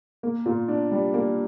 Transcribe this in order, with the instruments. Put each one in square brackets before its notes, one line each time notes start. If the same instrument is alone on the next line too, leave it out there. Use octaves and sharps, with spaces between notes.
[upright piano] A#3
A#2
D4
G3
A#3